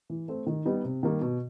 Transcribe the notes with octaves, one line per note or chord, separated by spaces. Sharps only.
E3
A3 C4
D#3
G3 B3 D#4
C3
D#3 G3 A#3
B2